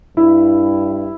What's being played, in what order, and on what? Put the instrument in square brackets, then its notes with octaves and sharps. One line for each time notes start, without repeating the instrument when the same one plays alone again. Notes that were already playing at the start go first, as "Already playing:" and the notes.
[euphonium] G2 [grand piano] E4